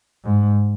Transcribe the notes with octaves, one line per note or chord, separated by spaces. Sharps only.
G#2